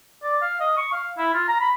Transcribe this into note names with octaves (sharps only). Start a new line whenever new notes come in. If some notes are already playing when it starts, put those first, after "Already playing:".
D5
F5
D#5
C#6
F5
E4
F4
A#5
B5